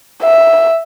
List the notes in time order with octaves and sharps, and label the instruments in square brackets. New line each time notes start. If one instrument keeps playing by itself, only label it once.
[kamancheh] E5